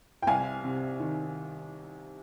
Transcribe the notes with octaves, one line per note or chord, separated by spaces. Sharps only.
G5
C2 F5 G#5
C3
D#3